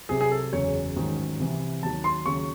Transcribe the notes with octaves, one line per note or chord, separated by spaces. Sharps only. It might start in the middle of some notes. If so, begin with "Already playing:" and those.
C2 C3 F#3 G#4
G#4
A4
F#1 E2 C#3 F#3 C#5
A1 G#2 D#3 F#3
C2 C3 E3
D#2 D#3 F#3 A5
C6
D#2 C#3 F#3 C#6